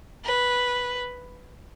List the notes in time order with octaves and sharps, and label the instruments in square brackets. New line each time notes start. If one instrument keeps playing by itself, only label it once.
[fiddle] B4